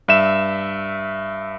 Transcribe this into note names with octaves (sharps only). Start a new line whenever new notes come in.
G2 E5 E7